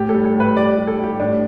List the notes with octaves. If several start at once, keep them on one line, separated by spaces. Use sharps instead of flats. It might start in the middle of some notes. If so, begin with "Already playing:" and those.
Already playing: A2 G4
A4
G3
A4
A2 B4
G3 D5
G3
A4
G3 G4
A2 D4